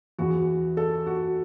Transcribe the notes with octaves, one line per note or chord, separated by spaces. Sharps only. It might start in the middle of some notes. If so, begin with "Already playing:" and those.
E2 E3 F#4
A4
F#4